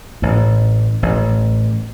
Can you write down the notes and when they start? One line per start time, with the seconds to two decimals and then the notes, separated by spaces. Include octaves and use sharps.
0.22 A1 A2
1.03 A1 A2